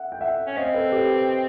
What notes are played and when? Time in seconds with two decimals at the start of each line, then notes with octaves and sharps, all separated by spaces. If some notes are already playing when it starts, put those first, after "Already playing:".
Already playing: E5 F#5
0.12 G5
0.21 E5 F#5
0.47 C#4
0.57 C4 D#5 F5
0.74 A4 B4
0.92 G4 A4